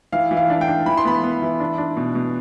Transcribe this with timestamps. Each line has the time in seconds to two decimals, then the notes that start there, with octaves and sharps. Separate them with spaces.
0.13 E3 F5
0.31 E3
0.37 F5
0.50 D4
0.61 G5
0.68 D4
0.86 E3 B5
0.97 C6
1.05 B3 B5
1.24 B3
1.42 E3
1.60 D4
1.78 D4
1.97 B2
2.15 B2